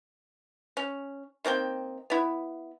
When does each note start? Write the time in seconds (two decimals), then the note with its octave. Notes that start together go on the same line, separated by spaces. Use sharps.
0.77 C#4
1.45 D#3 A#3 C4 G5
2.10 B3 E4